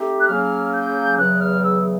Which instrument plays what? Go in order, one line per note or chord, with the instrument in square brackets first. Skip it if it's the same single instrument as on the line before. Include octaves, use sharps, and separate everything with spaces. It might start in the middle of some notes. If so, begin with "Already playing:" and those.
Already playing: [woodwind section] A3 C4 D#4 G4
[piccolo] F#6
[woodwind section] C#3 F#3 A#3 C#4 [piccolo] F6
[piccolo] G6
[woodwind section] E2 C#3 F#3 [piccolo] F#6
[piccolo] F6
E6